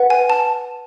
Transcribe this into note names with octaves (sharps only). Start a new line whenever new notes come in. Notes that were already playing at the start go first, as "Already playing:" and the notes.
Already playing: B4 F#5
G#5
A5